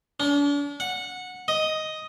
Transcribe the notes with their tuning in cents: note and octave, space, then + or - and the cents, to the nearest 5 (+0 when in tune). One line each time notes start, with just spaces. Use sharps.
D4 -40
F#5 -15
D#5 +5